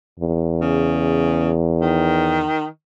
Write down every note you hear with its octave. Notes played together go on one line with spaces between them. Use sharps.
E2
C#3
D#3